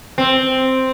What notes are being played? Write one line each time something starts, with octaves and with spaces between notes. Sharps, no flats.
C4